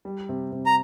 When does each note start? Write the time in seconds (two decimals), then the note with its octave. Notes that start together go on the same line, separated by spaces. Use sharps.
0.05 G3
0.29 C3
0.52 C3
0.66 A#5